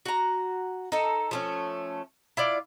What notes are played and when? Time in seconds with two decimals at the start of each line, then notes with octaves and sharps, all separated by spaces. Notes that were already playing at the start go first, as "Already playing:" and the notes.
0.05 F#4 A#5
0.92 D#4 A4
1.31 F3 A3 C#4
2.37 E4 F4 D5